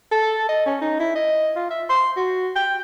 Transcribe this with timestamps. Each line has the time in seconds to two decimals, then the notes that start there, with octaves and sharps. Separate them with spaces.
0.12 A4
0.49 D#5
0.66 C#4
0.81 D#4
1.00 E4
1.15 D#5
1.56 F4
1.71 E5
1.90 C6
2.17 F#4
2.56 G5